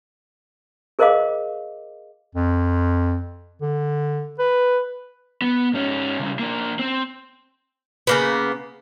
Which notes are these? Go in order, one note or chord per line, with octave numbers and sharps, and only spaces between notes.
G#4 A#4 C5 D#5 F5 D6
F2
D3
B4
B3
G#2 C#4
C2 C#3
A#3 D4
C4
C#3 A#3 B3